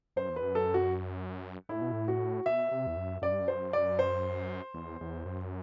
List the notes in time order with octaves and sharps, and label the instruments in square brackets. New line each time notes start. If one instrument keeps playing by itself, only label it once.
[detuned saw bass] F#2 [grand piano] C5
[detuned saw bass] E2
[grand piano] B4
[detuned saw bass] F#2
[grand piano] A4
F#4
[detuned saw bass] A2 [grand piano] E4
[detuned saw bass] B2
A2
[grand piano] F#4
[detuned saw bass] B2 [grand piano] E5
[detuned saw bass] C3
E2
F#2
[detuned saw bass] F#2 [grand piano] D5
[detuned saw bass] G2
F#2
[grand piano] C5
D5
C5
[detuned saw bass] E2
E2
F#2